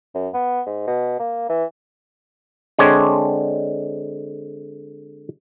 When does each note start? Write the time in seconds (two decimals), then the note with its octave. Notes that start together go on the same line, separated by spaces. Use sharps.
0.15 F#2
0.34 B3
0.66 G#2
0.87 B2
1.19 A#3
1.49 E3
2.79 D3 G#3 C4 D4 C#5